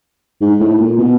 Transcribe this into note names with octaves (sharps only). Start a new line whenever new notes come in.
G#2
A2
A#2
B2